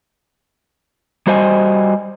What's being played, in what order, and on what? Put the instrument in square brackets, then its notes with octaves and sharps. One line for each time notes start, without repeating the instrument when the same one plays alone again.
[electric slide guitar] G3 F#4 C5 D#5 G5 G#5